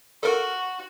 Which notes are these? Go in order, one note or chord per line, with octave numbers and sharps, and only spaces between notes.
F#4 A4 A#4